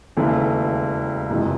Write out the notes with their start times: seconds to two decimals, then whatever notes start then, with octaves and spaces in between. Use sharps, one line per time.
0.17 E1 D#2 C#3 E3 A3
1.29 F#1 F2 C3 E3 G#3